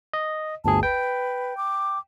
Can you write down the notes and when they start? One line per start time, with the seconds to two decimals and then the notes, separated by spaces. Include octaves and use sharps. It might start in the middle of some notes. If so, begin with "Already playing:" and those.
0.13 D#5
0.65 G1 D2 G#4 A5
0.83 B4 G5
1.57 D6